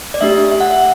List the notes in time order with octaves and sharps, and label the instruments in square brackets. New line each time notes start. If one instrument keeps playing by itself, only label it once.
[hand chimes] D5
A3 D4 G4 E5
E5
F#5
E5